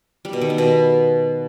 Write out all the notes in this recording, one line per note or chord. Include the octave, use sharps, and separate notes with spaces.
G3
B2
D#3
B3
B2